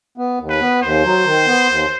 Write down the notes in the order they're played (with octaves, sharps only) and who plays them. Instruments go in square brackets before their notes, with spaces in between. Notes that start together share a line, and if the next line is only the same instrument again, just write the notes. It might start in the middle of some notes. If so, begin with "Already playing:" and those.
[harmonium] B3
D#2
[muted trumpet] B4
[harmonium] B3
[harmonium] D#2 [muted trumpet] C5
[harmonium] F#3
D#3
B3
D#2